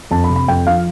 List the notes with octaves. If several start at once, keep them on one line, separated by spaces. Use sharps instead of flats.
F2 A5
B5
C3
B5
F2 G5
F3 F5